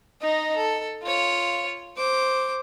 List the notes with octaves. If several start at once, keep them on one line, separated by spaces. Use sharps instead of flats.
D#4 D#5
A4
F4 C#5
C5 D6